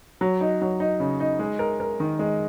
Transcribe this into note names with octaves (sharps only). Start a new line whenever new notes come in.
F#3
D#4
F#3
D#4
C#3
D#4
G#3
A#4
A#4
D#3
G#3